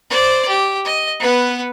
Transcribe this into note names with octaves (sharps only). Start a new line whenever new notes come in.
C5 D5
G4
D#5
B3 B4